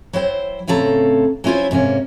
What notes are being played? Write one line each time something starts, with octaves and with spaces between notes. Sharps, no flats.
F#3 E4 C5 G5
A2 C#3 C4 A4 A#5
F#3 C#4 E4 F4 C5 E5
G#2 C3 A#3 C#4